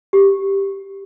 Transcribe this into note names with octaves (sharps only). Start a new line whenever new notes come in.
G4